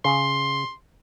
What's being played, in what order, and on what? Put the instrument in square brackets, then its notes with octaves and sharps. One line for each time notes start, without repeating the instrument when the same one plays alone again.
[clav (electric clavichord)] C#3 [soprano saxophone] C6